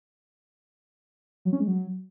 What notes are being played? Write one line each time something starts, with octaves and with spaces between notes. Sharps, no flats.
F#3
C#4
G#3
F#3